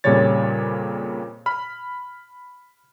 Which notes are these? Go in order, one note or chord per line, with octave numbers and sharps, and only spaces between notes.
F2 A#2 C#3 G3 C#5 A6
B5 F6